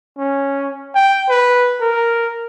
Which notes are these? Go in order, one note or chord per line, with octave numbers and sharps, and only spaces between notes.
C#4
G5
B4
A#4